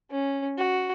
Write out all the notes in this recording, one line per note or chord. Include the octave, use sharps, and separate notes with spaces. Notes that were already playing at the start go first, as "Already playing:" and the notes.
C#4
F#4